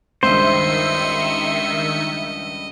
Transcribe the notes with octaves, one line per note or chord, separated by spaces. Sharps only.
C#2 G2 D#3 C5 D#5 E5 C#7